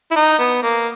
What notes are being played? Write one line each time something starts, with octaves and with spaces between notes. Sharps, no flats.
E4
D#4
B3
A#3